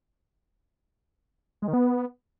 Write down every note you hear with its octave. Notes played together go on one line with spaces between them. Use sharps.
G#3
D#3
B3